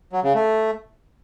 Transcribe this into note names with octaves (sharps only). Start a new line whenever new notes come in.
F#3
C#3
A3